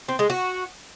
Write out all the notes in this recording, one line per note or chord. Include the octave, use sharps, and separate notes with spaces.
C4
G#3
F#4